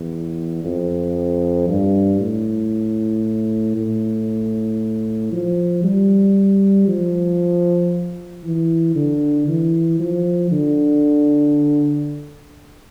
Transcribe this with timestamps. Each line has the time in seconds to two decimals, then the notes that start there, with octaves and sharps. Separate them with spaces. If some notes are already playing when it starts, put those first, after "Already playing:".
Already playing: E2
0.64 F2
1.69 G2
2.20 A2
3.76 A2
5.32 F3
5.84 G3
6.88 F3
8.44 E3
8.95 D3
9.47 E3
10.00 F3
10.51 D3